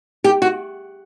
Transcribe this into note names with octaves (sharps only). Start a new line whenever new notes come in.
G4
F#4